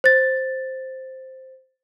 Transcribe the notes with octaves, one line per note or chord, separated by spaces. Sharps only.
C5 A6